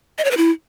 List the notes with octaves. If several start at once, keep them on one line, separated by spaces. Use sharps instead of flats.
D#5
C#5
B4
E4